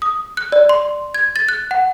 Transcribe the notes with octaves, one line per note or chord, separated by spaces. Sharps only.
D#6
F#6
D5
C6
G#6
A6
F#6
F#5